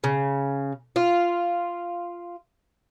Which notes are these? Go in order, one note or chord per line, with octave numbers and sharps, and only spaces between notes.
C#3
F4